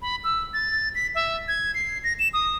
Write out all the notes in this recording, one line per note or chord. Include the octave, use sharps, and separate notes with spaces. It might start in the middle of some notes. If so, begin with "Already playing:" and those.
B5
E6
A6
B6
E5
G#6
C7
A#6
E7
D#6